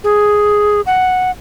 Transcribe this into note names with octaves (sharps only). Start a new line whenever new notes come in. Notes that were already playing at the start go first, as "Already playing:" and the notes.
G#4
F#5